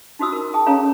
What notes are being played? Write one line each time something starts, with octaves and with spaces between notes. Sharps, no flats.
D#4 F4 F#4 C5 D#6 E6
A#4
G#4 G5 A5 D#6
C#4 G#4 A4 C#5 F5 A#5